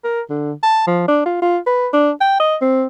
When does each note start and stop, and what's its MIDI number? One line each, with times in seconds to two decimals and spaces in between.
0.04 0.21 70
0.30 0.52 50
0.63 0.86 81
0.87 1.03 53
1.08 1.21 62
1.26 1.37 65
1.42 1.58 65
1.67 1.88 71
1.93 2.11 62
2.21 2.39 79
2.40 2.56 75
2.61 2.85 60